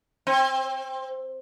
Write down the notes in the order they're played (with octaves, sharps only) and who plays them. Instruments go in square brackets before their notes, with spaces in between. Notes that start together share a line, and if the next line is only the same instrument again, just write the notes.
[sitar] C4